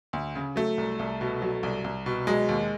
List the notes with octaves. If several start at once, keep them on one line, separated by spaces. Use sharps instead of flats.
D2
C#3
F#3 A3
C2
C2
B2
F#3
C2
C2
B2
F#3 G#3
D#2